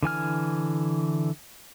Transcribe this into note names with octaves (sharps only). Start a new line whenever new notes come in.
D3 E3 G#5 F6